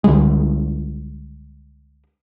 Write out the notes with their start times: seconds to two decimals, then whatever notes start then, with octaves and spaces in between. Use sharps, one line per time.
0.04 C#2 D3 G3 G#3